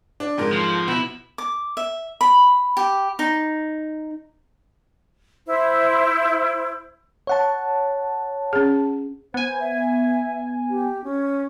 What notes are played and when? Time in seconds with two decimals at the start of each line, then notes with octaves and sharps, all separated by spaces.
0.20 D4
0.38 F2 G#2 A#4
0.53 F3
0.88 B2 E4
1.38 D6
1.77 E5
2.21 B5
2.77 G4
3.19 D#4
5.46 E4 C5
7.27 C#5 F#5 A5
8.53 C#4 G#4
9.34 B3 C5 G#5
9.60 E5
10.70 G4
11.04 C#4